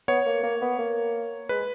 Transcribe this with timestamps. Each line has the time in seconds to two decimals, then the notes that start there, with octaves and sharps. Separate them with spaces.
0.08 B3 C#5
0.26 A#3
0.43 A#3
0.62 B3
0.79 A#3
1.49 G#3 B4